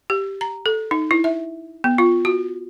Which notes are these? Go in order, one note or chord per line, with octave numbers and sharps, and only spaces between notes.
G4
A#5
A4
D#4
E4
E5
B3
F4
F#4